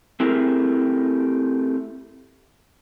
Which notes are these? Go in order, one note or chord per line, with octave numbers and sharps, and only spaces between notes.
A3 C4 E4 G4 G#4 A#4